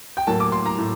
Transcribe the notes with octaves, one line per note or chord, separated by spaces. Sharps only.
G5
A2 F#3 A#3 A5
D6
C6
A#5
A2